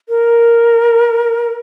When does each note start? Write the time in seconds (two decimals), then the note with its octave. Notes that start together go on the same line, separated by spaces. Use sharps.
0.09 A#4